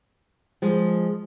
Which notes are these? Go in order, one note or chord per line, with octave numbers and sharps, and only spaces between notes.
F3 G#3